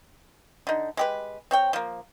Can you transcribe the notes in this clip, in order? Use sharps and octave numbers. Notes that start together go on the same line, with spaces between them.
D3 D#4
G#3 G4 B4
C4 C#5 G5
F3 A#3